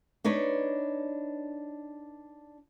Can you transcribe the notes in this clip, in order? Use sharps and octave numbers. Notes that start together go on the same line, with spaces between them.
D4 D#4 B4 C#5